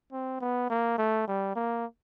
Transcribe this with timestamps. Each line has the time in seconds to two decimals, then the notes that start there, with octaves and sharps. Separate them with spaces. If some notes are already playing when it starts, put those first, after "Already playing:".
0.12 C4
0.41 B3
0.70 A#3
0.98 A3
1.28 G3
1.56 A#3